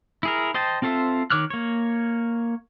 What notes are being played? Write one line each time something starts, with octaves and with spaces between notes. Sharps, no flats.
E4 G#4 A#4
C5 D#5 G5 A5
C4 F4 A4 C5 E5
D#3 C#5 D6 F6 F#6
A#3 C#5